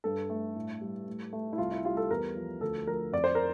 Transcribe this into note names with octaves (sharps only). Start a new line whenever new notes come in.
G2 A4
A3
A2
G3
A2
A3
E4
C2 F4
E4
G3 F4
A4
E2 A#4
F3
D2 A4
F3 A#4
F2 D5
C5
A#4